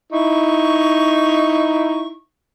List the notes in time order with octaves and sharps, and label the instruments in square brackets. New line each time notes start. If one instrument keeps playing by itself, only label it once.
[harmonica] D#4 E4 [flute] C#6